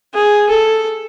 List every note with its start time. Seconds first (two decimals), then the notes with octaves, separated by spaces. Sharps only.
0.14 G#4
0.50 A4